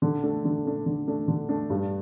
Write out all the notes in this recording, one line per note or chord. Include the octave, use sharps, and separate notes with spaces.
D3
A3 D4
D3
A3 D4
D3
A3 D4
D3
A3 D4
G2